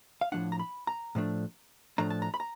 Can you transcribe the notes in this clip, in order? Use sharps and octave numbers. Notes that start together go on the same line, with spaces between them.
F5
A2 F3 A3 D4 F#5
A#5
B5
A#5
A2 F3 A3 D4
A2 F3 A3 D4 A#5
A5
A#5
B5
A#5